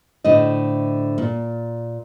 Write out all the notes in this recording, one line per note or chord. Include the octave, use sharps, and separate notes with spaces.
A2 D3 C5 D#5
A#2